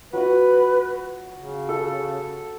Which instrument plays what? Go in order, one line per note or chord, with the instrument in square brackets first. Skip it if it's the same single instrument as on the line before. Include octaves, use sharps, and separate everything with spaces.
[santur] F#3 F#4 [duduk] B4
[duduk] C#3
[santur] A4